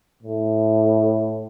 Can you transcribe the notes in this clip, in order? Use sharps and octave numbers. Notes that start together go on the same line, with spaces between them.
A2